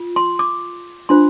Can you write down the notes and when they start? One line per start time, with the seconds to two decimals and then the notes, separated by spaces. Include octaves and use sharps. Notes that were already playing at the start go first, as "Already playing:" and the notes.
Already playing: F4
0.16 C6
0.39 D6
1.09 D4 F4 C5 C6